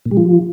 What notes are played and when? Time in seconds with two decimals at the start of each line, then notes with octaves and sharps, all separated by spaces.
0.05 A#2
0.11 G3
0.17 F3